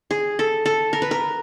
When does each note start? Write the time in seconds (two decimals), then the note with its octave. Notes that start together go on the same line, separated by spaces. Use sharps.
0.11 G#4
0.39 A4
0.65 A4
0.93 A#4
1.02 B4
1.11 A#4